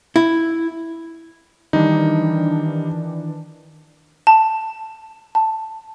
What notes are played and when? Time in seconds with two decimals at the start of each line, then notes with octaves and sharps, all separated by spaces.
0.16 E4
1.73 D#3 E3 G3 D4 D#4
4.27 A5
5.35 A5